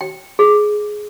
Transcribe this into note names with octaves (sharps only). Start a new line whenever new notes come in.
G5
G#4